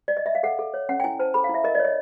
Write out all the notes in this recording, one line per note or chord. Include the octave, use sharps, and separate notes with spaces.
D5
D#5
E5
F5
A4 F#5
A4
C#5
C#4 F#5
G5
E4 G#5
C5 A5
A4 B5
F5
E4
E5
A#4 D#5
D5
C#5
D#5